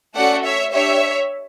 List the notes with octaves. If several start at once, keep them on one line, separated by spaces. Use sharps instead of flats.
A3 C#4 F#4 A4 D5 F#5
C#5 E5
D4 G4 C#5 E5